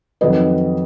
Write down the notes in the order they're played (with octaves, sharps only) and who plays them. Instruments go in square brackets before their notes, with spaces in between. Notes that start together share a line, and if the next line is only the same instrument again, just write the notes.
[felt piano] F2 D#3 F#3 B4 D#5